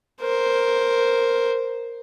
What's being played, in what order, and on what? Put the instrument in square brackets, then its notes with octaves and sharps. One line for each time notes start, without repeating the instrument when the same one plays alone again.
[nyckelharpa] A#4 C5